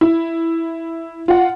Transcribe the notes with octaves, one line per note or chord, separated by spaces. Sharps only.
E4
F4 F#5